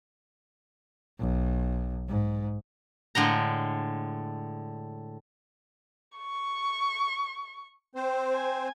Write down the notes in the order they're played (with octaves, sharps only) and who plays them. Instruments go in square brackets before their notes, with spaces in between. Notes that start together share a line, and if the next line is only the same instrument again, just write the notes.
[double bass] B1
G#2
[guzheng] A2 D3 G#3 A#5
[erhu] C#6
[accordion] C4 C5
[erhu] G#5